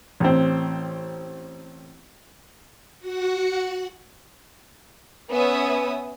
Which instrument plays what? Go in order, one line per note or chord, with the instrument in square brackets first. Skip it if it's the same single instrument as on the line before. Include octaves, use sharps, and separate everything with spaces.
[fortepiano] A1 C4
[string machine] F#4 F#5
[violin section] B3 C#4 B4 E5 G#5 D#6